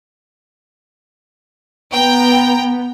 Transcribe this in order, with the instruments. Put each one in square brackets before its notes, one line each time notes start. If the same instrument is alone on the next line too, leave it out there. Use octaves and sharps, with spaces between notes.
[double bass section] B3 [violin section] G5 A#5